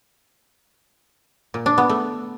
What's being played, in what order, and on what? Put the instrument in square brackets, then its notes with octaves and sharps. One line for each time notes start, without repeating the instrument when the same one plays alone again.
[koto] A#2
D4
B3
A3